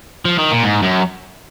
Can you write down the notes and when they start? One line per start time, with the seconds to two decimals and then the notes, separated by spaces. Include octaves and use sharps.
0.25 F3
0.38 D#3
0.51 A#2
0.63 G#2
0.82 F#2